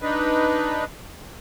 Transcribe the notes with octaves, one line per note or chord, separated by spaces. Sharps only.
D4 D#4 B4